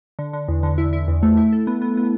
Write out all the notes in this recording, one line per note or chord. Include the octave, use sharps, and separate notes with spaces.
D3
D3
E2
D3
E4
E4
E2
A3
E4
A4
B3
B3
B3